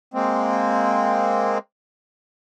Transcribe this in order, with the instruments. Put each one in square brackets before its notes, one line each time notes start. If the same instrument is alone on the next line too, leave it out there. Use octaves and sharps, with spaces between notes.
[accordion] G#3 A#3 C4